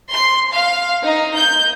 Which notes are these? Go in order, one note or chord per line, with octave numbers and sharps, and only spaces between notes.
C6
F5
D#4
G6